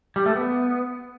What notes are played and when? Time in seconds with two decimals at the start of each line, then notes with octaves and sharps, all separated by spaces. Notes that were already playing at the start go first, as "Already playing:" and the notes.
0.16 G3
0.26 A3
0.36 B3